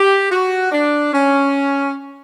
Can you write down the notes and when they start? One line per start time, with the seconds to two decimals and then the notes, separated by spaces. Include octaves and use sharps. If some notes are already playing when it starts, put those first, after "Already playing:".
Already playing: G4
0.31 F#4
0.72 D4
1.12 C#4